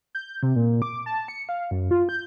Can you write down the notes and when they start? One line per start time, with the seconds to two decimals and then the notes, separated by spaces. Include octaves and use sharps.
0.15 G6
0.43 C3
0.56 A#2
0.82 D6
1.06 A5
1.28 C#7
1.49 F5
1.71 F#2
1.91 F4
2.09 G6